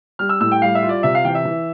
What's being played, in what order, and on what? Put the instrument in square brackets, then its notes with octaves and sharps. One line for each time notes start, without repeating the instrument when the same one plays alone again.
[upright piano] G3 [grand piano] F6
[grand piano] E6
[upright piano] A2 [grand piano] E6
[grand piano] G5
[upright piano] G3 [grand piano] F5
[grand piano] E5
[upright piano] F4
[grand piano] D5
[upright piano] C3 [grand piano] E5
[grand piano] F5
[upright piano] E3 [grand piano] G5
[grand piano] E5
[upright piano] E3